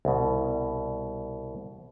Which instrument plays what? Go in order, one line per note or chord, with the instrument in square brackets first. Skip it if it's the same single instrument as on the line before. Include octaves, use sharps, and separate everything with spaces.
[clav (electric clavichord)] C2 B2